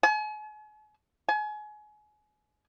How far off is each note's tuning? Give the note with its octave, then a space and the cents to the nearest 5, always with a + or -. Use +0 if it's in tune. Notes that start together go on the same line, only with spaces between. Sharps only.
G#5 +40
G#5 +30